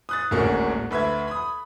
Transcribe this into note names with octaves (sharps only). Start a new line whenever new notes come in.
D#6 F#6 A6
D1 G#1 D2 A#3 C#4 F#4
D2 B4 E5 B5 G#6
B5 D#6